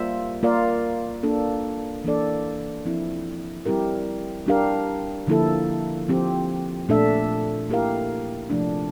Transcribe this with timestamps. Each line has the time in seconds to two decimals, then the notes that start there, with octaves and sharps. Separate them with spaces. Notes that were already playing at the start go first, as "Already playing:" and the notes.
Already playing: G3 A#3 F4 C5 E5
0.43 A#3 F4 A#4 D5 F5
1.23 A#3 D4 A4
2.04 E3 A#3 D4 A4 D5
2.85 F3 C4 E4
3.66 G3 C4 E4 G4 A#4
4.46 G3 D4 G4 A#4 F5
5.27 D3 F3 A#3 E4 A4
6.08 F3 C4 G4
6.89 A#2 A3 D4 A4 E5
7.69 A#3 E4 G4 A#4 F5
8.50 C3 F3 A3 D4